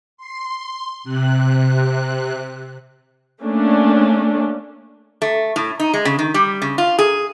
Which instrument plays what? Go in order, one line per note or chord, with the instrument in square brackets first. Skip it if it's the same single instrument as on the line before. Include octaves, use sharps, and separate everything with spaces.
[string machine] C6
C3 F#6
[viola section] A3 A#3 C#4 D4
[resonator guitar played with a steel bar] A3
A2
D#4
G#3
C#3
D#3
G3
C#3
F4
G#4